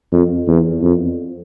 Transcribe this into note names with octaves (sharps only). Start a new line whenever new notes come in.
F2
E2
F2